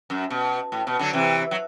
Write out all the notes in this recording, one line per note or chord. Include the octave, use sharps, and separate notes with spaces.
F#2
B2
A2
B2
D3 F#3
C3 E3
F#3